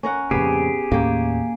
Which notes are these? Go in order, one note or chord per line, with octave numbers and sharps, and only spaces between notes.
C#4 A#4 F#5
F2 A#2 C#3 B3 G4 G#4
D#2 A2 A#3 C#4 G5